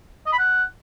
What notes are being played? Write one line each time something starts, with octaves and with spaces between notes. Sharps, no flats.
D#5
B5
F#5